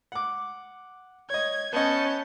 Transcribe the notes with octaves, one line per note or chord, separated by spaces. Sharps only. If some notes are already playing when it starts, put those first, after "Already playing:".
F#5 D6
C#5 D#5 G#6
B3 C#4 D#5 A5 G6